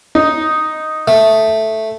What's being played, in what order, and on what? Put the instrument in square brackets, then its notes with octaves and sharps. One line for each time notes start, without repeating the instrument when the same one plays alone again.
[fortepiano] D#4
[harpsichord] A3